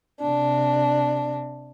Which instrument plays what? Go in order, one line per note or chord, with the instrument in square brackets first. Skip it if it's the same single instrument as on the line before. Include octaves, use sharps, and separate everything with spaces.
[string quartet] C3 D4